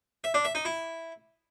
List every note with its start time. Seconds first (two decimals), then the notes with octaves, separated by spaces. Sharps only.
0.24 E5
0.34 D4
0.45 E5
0.55 D#4
0.65 E4